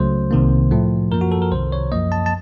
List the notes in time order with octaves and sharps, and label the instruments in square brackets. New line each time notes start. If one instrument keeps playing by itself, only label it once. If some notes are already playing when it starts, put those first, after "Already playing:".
Already playing: [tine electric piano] C#2 C#3 F#3 A3 C5
C2 C3 D#3 A#3
A2 F3 A3
F#2 F3 A#3 A#4
F#4
A4
A#4
C2 C3 D#3 C5
C#5
F#2 F3 A#3 D#5
A5
A5